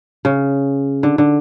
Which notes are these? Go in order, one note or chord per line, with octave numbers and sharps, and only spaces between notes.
C#3
D3
D3